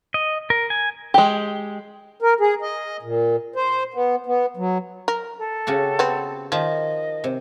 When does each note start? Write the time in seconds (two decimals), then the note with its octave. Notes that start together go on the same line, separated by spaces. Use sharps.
0.14 D#5
0.50 A#4
0.70 G#5
1.14 G#3 G4
2.21 A#4
2.40 G#4
2.62 D#5
3.02 A#2
3.56 C5
3.94 B3
4.26 B3
4.57 F#3
5.08 A#4
5.38 A4
5.67 C#3 F#4 G4
5.99 B3 C4
6.52 D#3 F3 D#5
7.24 C3